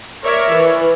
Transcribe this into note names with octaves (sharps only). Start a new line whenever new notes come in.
A#4 C#5 D5 E5
E3